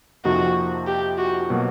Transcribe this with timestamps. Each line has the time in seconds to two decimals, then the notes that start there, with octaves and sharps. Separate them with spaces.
0.25 F2 C3 F3 A#3 D#4 F#4
0.87 G4
1.18 F#4
1.50 B2 F#3 A#3